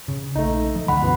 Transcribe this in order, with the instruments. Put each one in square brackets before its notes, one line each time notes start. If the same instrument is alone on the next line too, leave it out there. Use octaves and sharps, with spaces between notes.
[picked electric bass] C#3
[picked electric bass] A#1 [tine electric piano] A3 D#4
[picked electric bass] F3
[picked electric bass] C2 D3 [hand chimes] F#5 B5
[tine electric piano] F#2 B2 E3